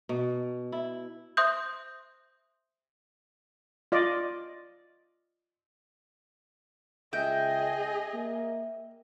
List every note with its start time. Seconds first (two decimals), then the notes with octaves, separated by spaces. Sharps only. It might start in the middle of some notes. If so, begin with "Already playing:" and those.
0.09 B2
0.72 E4
1.37 C5 E5 C6 D#6 F#6 G6
3.92 F4 D5 D#5
7.13 C#2 G#4 D#5 E5 G5
8.14 A#3